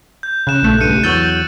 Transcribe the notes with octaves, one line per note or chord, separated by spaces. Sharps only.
G6
C#3 F#6 E7
A#1 A3
C#2 G2 C#7 D#7
E2 F#3 C#6 E6 G6 A6